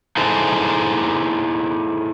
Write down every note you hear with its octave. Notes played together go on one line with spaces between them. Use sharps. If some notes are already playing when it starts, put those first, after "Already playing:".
D#4 E4 G#4 A4 C5